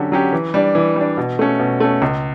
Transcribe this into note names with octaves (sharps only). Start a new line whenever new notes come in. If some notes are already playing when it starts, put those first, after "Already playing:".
Already playing: D3 F#3 C#4 G4
F#3 C#4 G4
E3
G3 D4
E3
G3 D4
B2
A3 C#4
B2
A3 C#4
C#2